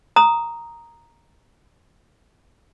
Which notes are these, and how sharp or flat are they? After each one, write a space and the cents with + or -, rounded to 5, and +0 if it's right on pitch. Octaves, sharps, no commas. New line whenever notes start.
A#5 +0 D#6 +0